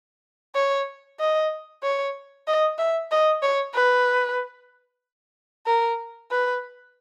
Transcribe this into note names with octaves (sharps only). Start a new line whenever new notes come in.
C#5
D#5
C#5
D#5
E5
D#5
C#5
B4
A#4
B4